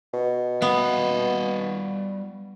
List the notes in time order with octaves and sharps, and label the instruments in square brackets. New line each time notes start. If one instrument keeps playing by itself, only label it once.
[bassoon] B2
[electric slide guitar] G3 F5 F#5 [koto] B3